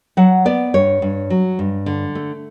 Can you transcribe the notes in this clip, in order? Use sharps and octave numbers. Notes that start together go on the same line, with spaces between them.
F#3 F#5
B3 D5
G2 C#5
G2
F#3
G2
D3
A3